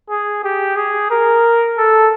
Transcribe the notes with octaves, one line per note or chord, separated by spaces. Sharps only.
G#4
G4
G#4
A#4
A4